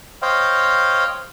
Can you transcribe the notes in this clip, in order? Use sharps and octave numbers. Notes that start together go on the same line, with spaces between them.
C5 C#5 D#5 F5 G5